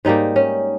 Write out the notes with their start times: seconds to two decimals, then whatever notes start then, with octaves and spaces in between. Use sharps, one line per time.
0.05 G#2 G3 A#3 D#4
0.36 C#4